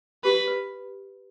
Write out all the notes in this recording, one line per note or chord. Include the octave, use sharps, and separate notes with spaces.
G4 B4
B4